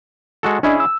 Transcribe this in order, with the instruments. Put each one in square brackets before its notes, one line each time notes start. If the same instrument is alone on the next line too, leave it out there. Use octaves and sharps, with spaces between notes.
[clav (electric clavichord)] G#3 F#4 A4
[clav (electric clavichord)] C#4 E4 G#4 [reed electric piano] D4 D#5
[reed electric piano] E6